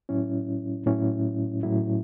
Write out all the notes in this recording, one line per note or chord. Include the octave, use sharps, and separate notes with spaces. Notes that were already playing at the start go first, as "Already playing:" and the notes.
A2 F#3 C#4 E4
A2 F#3 C#4 E4
A2 F#3 C#4 E4